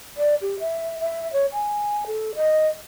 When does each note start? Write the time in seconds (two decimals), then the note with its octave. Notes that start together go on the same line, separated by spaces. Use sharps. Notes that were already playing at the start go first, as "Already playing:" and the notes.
0.17 D5
0.41 G4
0.59 E5
0.99 E5
1.32 C#5
1.52 G#5
2.06 A4
2.35 D#5